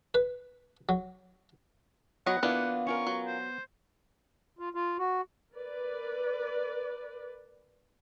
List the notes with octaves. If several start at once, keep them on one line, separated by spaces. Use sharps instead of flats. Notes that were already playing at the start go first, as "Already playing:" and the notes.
B4
F#3
F#3 B3 C#5 D#5 F#5
E3 A#3 B3 D4 F4
C#4 F4 A#4 C#6
F#3
C5
F4
F4
F#4
A#4 B4 D5